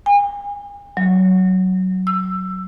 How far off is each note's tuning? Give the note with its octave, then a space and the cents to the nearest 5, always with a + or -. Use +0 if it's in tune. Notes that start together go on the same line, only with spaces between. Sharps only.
G#5 -40
F#3 +10
E6 +15